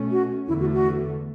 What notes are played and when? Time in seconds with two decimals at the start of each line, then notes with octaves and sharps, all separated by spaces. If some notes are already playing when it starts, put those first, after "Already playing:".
Already playing: B2 A3 C#4
0.11 F#4
0.48 E2 D3 A3 E4
0.60 F#4
0.73 F#4